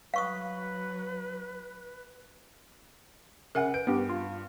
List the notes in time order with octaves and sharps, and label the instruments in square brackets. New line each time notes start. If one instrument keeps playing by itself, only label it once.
[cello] F#3 [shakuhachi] B4 [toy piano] F5 C#6 D#6
[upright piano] C#3 F#5 [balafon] A#4 E5 G#5
[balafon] B4 [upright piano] D7
[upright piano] G2 [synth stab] B3 G4
[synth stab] F4